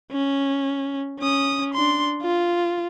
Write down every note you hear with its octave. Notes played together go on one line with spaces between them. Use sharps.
C#4
C#4 D#6
D4 C6
F4